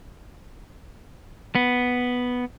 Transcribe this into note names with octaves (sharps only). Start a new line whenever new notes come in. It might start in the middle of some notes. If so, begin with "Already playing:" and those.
B3